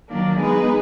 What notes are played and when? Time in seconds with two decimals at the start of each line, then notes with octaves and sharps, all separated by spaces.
0.09 D#3 F#3 A#3 D4
0.39 G#3 B3 D#4 G#4 B4